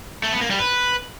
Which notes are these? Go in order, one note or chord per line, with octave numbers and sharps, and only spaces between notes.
A3
B3
A#3
G3
B4